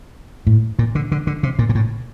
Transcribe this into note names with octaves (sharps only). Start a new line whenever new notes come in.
A2
A#2
D3
D3
D3
C3
A#2
A#2
A2